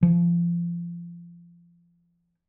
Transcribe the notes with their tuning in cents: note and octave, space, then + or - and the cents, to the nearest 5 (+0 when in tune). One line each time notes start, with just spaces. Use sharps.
F3 -25